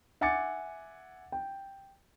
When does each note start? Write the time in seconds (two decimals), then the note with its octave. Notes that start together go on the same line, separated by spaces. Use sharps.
0.21 E5 F#5 G#5 D6 A6 C#7
1.32 G5